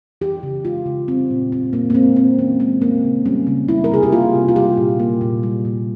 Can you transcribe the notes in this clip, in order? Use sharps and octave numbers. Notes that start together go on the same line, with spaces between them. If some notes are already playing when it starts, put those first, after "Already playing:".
E3 G4
C#3
G#3 F4
C#3
G3 C4
A#2
A#3 C4
A#2 A#3
A#3
G#3 C4
E3 C4
E3 C#4
G#3 C4
E3 A#3
C#3
G3 C#4
C#3
G3 E4
A#4
C3 G#4
G4
A#3 F4
C3
F4
G3 G4
A#2
A#3
A#2
G3
A#2